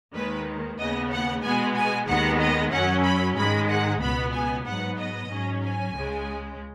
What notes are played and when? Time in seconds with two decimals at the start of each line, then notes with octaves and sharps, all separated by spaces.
0.14 D#2 D#3 G#3 B4
0.78 D#2 C#3 B3 D#5
1.11 F#5
1.42 B2 G#3 B3 G#5
1.75 G#5
2.07 D#2 D#3 G#3 B3 F#5
2.40 D#5
2.71 F#2 F#3 C#4 F#5
3.04 B5
3.37 G#2 D#3 G#3 B5
3.69 F#5
4.01 C#2 B2 B3 B5
4.33 G#5
4.65 G#2 F#3 B3 F#5
4.98 D#5
5.30 G#2 F#3 C#4
5.63 G#5
5.94 C#2 C#3 G#3